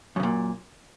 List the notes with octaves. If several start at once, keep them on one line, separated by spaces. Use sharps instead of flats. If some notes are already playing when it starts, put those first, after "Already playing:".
F#2 A#2 C#3